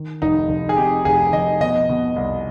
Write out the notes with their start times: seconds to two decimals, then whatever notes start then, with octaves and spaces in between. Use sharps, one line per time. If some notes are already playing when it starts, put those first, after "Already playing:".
Already playing: D#3
0.22 F1 D#4
0.49 F1
0.69 G#4
0.76 C3 G4
1.05 F1 G#4
1.33 F2 D#5
1.60 B2 D#5
1.89 B2
2.16 C2